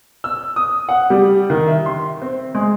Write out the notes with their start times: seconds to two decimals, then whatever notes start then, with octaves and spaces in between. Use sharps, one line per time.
0.24 E6
0.56 D#6
0.89 F#5
1.10 G3
1.50 D#3
1.68 E5
1.86 C6
2.22 C4
2.55 G#3